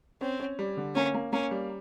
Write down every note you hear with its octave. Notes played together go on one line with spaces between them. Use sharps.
C4 C#4
C#4
G3
D3
A#3 C#4
A#3
A#3 C#4
G3